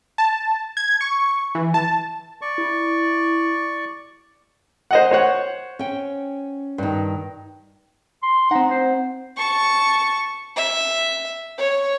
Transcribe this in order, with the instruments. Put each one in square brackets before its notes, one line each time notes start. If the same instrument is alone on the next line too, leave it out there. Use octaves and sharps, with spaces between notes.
[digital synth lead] A5
G#6
C#6
E3
A5
[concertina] D5 C#6
[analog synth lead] E4
[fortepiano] C5 D#5 F#5
C5 C#5 F#5
[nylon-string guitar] C#4 G5
G2 D#3
[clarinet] C6
[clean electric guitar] C4 F#5 [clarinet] D#4
[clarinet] C5
[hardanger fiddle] A5 C#6
E5
C#5